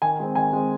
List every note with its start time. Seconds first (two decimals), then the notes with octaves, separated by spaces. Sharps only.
0.02 D#3 G#5
0.19 G#3 C4 G#5
0.35 D#3 G#5
0.53 G#3 C4